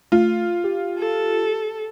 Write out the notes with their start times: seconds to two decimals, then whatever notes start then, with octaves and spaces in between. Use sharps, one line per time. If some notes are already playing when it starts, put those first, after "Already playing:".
0.12 A3 F4
0.64 G4
0.99 A4